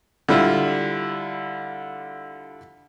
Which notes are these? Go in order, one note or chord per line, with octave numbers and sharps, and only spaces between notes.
D3 G3 E4 F4